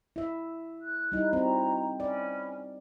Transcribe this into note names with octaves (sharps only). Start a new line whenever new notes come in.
E4 E5
F#6
G3 D#4 E4
C4 E4 F#4 A#5
C#4 D5 B5